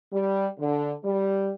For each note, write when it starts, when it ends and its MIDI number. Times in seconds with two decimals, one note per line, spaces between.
0.13 0.46 55
0.58 0.92 50
1.04 1.51 55